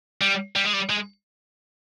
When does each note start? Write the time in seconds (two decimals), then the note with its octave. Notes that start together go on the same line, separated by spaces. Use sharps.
0.21 G3
0.56 G3
0.65 G#3
0.73 G3
0.90 G#3